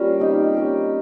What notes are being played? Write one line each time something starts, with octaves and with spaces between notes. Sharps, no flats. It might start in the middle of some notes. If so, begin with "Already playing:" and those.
Already playing: G3 A#3 C#4 F4 A#4
C4 D#4 G4
G3 C#4 G4